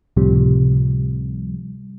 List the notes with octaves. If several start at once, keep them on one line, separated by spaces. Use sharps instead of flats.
C#2 A2 C3 F3 G3